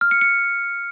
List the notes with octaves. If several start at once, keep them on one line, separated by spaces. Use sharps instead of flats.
F6
C#7
C#7